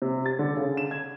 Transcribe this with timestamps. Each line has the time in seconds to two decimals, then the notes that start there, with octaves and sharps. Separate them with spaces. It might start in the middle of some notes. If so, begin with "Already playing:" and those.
0.02 C3
0.26 A6
0.39 D3
0.57 C#3
0.77 E7
0.91 G#6